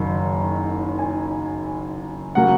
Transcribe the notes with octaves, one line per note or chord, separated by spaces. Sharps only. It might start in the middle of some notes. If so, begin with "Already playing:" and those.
Already playing: F#1 F#2 D#3
G#5
C#3 F#3 A#3 F#5